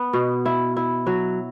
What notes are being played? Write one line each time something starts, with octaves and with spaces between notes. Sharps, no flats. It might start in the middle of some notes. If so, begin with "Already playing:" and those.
Already playing: B3
B2
E4
E4
F#3